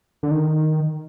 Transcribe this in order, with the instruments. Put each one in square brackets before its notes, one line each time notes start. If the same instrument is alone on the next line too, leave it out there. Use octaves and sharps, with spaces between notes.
[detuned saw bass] D3
D#3